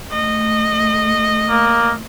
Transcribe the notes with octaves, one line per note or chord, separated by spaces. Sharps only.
A3 D#5
A#3